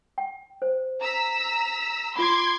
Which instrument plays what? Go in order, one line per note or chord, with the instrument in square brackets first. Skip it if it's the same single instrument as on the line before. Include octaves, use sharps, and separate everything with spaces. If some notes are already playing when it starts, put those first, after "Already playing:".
[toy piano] G5
C5
[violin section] A#5 E6 B6
[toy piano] F4 B5 [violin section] C6 D6 G#6